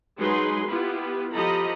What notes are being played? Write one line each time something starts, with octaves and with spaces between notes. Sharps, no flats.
F#3 G#3 D#4 G#4 B4 C6
B3 E4 F4 G4 B4
F3 G4 A4 D#5 A#5 B5